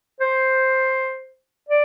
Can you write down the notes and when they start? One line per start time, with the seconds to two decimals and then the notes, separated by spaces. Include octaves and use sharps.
0.21 C5
1.69 D5